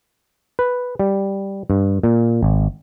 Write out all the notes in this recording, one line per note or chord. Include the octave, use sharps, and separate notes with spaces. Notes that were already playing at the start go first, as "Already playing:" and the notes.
B4
G3
G2
A#2
G#1